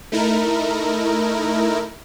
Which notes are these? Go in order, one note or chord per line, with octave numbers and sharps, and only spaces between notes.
A3 D#4 E4 A#4